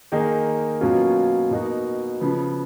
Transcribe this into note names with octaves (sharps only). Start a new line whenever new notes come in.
D#3 A#3 D#4 G#4
B2 F#3 A#3 C#4 F4
B2 A#3 D#4 F#4
C#3 F3 B3